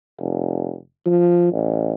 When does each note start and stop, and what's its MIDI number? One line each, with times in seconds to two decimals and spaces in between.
0.20 0.76 29
1.06 1.49 53
1.52 1.92 33